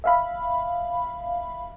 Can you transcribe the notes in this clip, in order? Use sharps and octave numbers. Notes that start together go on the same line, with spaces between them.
E5 F5 B5